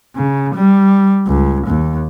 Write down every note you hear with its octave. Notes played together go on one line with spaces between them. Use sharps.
C#3
G3
C#2
D#2